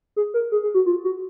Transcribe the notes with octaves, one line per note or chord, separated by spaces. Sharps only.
G#4
A#4
G#4
G#4
F#4
F4
F#4